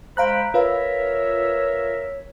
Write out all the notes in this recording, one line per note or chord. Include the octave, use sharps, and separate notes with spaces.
G#3 C5 F5 G5 A#5 B5 F#6
F4 A#4 B4 C#5 E5 F5